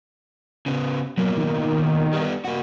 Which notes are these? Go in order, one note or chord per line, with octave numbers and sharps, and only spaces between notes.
C#3 B3
B2 F#3 A#3
D#3
G3 B3
A#3 F#4